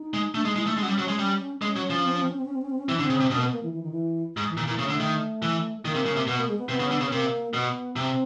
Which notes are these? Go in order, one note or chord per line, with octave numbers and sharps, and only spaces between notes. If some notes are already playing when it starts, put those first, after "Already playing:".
Already playing: D#4
G#3
A3 D4
G#3 D#4
G#3 E4
A3 D#4
G#3 C#4
F#3
G3
F#3
G#3
G3
G#3 C#4
F#3
F3
C4
C#4
C4
C#4
C4
C#4
C4
C#4
C4
C#4
E3 C4
C#4
D3
C4
C#3
C3
B2 C#4
A#3
B3
A#3
E3
E3
D#3
E3
G#2
E3
A#2 D#3
A#2 E3
C#3 A3
D3 A3
D#3
E3
A3
D#3 A#3
C3
C#3
C3
B2 B3
A#3
G#3
B3
C3 B3
C#3
D3
C#3
B3
C3 A#3
B2 B3
C3 C4